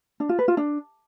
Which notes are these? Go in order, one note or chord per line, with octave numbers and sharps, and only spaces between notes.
D4
F4
B4
F4
D4